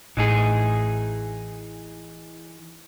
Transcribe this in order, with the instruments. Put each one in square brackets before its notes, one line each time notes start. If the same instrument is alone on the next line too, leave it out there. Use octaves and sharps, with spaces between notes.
[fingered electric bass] A1 A2 [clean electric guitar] E3 D#4 G#4